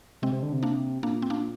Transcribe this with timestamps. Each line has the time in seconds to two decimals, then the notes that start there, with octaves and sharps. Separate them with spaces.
0.22 C3 G#3 C4
0.32 C3
0.43 D3
0.53 C3
0.63 A#3 D4
1.03 A#2 A#3 D4
1.22 C4
1.30 A#3 D4